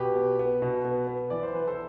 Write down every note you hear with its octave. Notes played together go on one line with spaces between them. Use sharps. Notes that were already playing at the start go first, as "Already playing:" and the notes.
Already playing: B2 G4 B4
B3
B3
B2
B3
B3
E3 D5
C5
E3 B4
A4 C5